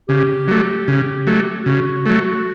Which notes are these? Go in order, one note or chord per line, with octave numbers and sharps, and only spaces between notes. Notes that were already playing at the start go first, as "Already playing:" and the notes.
C#3 G4
F#3 A3
C#3
F#3 A3
C#3 F#4
F#3 A3